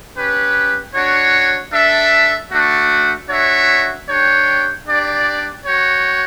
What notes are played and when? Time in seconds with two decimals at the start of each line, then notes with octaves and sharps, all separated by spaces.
0.17 C#4 G4 B4
0.95 D4 F#4 C#5
1.73 D4 A4 E5
2.52 A3 D4 F#4
3.29 D4 F#4 C#5 E5
4.08 D4 G4 C#5 G5
4.87 D4 G4 D5
5.65 F#4 C#5 G5